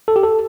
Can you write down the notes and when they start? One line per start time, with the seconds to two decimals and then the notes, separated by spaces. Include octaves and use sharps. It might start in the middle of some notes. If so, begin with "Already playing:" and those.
0.08 A4
0.16 G4
0.23 A4